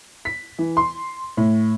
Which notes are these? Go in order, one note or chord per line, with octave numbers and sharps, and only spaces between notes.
B6
E3
C6
A2